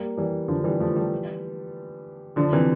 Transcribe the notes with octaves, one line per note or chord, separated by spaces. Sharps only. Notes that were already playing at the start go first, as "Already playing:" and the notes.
Already playing: G3 A#3
E3 G3
D3 F3
E3 G3
F3 A3
E3 G3
D3 F3
C3 E3